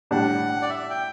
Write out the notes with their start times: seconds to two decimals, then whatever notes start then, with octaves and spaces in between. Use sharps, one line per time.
0.11 A2 G3 D4 F#5
0.62 D5
0.70 E5
0.90 G5